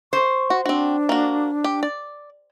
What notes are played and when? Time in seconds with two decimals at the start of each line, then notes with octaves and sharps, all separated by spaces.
0.13 C5 C#6
0.50 F#4
0.66 C4 D4 F#4
1.09 A#3 F#4
1.64 G4
1.83 D5